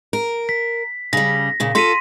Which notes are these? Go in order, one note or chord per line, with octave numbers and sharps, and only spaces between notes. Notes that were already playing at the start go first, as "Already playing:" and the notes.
A#4
B6
C#3 G3 A#6
A#2 C#3
F4 A4 C6 B6 D#7